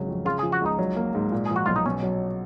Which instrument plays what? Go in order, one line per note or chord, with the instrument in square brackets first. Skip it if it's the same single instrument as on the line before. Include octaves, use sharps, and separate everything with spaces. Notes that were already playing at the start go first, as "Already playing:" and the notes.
Already playing: [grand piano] G#1 C#3 F#3
F2
[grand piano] C#3 [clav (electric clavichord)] F4
[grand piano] F3 [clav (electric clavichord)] G#4
[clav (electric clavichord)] F#4
[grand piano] C#2 [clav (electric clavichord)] D#4
[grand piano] F#3
A#3
G#2
A#2
[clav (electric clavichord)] G#4
[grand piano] F3
[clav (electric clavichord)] F#4
[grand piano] B1 [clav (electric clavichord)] F4
[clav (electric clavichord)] D#4
[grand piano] B2 [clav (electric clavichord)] C#4
[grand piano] F#3